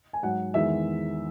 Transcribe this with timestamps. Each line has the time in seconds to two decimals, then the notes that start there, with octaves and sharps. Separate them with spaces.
0.13 G#5
0.23 G#2 F#3 F#5
0.54 E2 D#3 G#3 E5